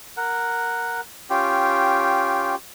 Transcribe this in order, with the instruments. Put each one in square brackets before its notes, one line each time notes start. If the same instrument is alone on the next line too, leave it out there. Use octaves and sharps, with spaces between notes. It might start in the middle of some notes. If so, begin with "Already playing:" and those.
[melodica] A#4 F#5
C#4 F4 G4 G5